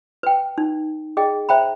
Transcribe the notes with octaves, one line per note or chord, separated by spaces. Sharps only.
B4 G5
D#4
G#4 D#5 G5
C5 E5 G5 A#5 B5